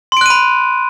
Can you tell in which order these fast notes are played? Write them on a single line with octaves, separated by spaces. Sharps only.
C6 D7 F#6 D#7 B5